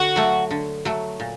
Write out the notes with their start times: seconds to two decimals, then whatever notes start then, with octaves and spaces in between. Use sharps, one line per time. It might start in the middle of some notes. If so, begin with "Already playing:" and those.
Already playing: D3 F#4
0.16 F#3 A3
0.51 D3
0.85 F#3 A3
1.20 A#2